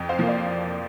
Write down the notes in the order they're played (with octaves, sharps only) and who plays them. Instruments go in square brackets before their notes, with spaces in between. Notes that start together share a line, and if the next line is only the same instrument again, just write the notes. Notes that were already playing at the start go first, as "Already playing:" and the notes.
Already playing: [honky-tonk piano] F2
C5 F5
F3 A#3
D5